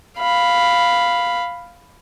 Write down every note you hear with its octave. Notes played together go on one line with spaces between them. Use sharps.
F5 B5